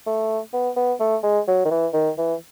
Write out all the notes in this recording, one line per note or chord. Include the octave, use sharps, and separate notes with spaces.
A3
B3
B3
A3
G#3
F#3
D#3
E3
D#3
E3